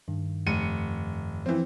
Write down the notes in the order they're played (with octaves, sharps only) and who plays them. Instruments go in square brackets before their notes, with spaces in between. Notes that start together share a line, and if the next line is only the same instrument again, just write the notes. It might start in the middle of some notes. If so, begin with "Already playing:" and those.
[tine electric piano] G2 D#3
[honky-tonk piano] F1 C#7 D#7
[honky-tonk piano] E3 C4 [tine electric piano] F3